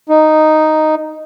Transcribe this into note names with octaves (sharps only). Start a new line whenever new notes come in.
D#4